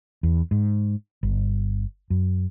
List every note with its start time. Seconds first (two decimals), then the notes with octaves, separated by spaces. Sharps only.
0.23 E2
0.51 G#2
1.23 G1
2.10 F#2